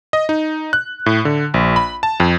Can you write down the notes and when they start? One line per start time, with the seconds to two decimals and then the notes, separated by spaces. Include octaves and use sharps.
0.13 D#5
0.29 D#4
0.73 F#6
1.06 A2
1.25 D3
1.54 A#1
1.76 B5
2.03 A5
2.20 F2